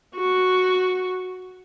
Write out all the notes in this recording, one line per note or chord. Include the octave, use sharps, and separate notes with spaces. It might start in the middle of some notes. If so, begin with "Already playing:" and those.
F#4 C#6